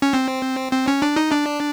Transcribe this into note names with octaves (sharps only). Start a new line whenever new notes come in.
C#4
C4
C4
C#4
D4
D#4
D4